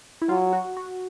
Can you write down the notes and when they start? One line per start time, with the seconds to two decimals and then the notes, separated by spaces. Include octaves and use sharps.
0.22 E4
0.28 F#3 F4
0.53 F#4
0.77 F#4